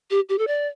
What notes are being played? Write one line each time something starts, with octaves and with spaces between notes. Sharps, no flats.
G4
G4
A4
D5